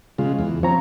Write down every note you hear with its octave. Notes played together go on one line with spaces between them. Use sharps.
C#3 G#3 F4
E2
F3 C4 C#5 A#5